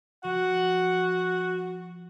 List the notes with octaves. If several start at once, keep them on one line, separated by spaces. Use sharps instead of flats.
F3 F#4 F#5